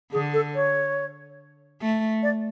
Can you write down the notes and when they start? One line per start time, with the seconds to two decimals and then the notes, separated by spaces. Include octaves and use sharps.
0.12 D3 G#4
0.34 A4
0.55 C#5
1.82 A3
2.23 D5